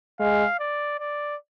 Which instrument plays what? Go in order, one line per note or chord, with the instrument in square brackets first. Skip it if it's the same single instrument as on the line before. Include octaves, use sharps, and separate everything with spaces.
[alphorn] G#3 [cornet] F5
[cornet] D5
D5